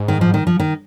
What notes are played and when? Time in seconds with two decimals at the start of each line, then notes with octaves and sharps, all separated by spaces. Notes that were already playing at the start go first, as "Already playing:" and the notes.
Already playing: G#2
0.08 D#3
0.21 F3
0.34 D#3
0.47 F3
0.60 D#3